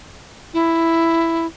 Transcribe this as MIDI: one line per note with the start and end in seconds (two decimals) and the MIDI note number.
0.54 1.47 64